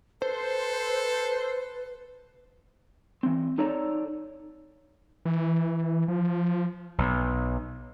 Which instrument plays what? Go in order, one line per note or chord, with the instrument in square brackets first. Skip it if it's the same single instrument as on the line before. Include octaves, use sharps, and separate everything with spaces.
[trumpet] A4 [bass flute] B4 [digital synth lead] C5
[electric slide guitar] E3 C4
D#4 A4 C#5 D5 A5 A#5
[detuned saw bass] E3
F3
[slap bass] B1